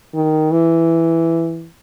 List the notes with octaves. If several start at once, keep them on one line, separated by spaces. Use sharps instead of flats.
D#3
E3